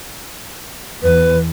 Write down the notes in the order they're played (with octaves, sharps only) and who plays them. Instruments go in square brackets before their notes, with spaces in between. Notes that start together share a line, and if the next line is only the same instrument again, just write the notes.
[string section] E2 [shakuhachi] B4